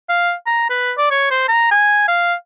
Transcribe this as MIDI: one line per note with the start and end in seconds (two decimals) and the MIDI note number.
0.09 0.33 77
0.47 0.67 82
0.70 0.92 71
0.98 1.09 74
1.11 1.27 73
1.31 1.44 72
1.48 1.71 82
1.71 2.04 80
2.08 2.34 77